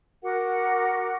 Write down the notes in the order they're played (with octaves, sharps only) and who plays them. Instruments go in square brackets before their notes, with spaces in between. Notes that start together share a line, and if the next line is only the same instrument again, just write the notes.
[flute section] F#4 A#4 F#5 D6